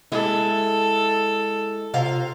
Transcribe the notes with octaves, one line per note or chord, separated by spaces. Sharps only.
G#3 E4 A4
C3 F4 F5